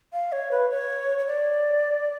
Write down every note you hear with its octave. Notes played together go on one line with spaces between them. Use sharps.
F5
C#5
B4
C#5
C#5
D5